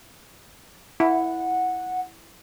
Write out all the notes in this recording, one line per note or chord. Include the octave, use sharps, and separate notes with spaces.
E4 F#5